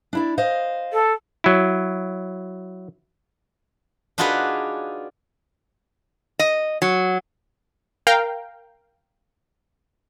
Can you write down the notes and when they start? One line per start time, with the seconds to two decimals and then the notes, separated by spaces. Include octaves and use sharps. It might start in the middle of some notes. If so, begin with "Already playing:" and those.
0.13 D4 E4 D5
0.38 C5 D#5 F5
0.92 A4
1.44 F#3 E4
4.18 D4 D#4 F4 F#4 G#4 B4
6.39 D#5
6.82 F#3
8.07 A#4 F5 G5 A#5